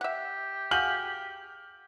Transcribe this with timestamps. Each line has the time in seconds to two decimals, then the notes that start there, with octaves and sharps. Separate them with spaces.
0.01 G4 E5 F#5
0.71 F#4 G#4 F5 F6 G6 F#7